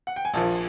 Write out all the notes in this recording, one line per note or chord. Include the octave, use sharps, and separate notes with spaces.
F#5
G5
G#5
A#1 A#2 F3 A5